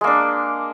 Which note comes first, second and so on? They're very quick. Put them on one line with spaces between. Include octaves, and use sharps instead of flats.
G#3 A#3 D4